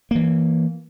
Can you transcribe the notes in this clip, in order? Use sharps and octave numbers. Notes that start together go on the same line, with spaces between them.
E3 A#3